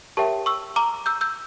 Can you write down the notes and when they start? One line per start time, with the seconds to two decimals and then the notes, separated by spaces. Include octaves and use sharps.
0.17 G4 A#4 C#5 E5 G5 A5 C#6
0.46 C#6 E6
0.76 A#5 D6
1.06 E6 G6
1.21 E6 G6